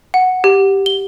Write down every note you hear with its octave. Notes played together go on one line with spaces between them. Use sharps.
F#5
G4
G7